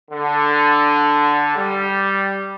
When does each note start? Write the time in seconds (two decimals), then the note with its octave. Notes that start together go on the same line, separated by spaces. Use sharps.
0.11 D3
1.56 G3